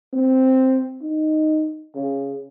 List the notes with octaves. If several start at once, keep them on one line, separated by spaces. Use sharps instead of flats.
C4
D#4
C#3